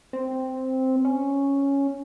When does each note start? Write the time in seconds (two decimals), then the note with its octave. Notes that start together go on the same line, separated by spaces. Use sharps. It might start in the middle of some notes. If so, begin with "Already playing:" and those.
0.13 C4
1.05 C#4